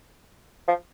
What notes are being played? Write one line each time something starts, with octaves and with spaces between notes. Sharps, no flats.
F3